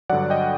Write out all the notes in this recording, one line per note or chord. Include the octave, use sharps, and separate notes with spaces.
G2 D3 F#3 D5 F#5
D#5 G5